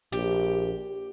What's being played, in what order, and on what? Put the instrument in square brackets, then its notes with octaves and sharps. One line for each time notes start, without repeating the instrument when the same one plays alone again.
[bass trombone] A#1 [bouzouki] G4